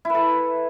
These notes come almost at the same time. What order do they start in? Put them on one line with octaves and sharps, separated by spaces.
E4 B4 A4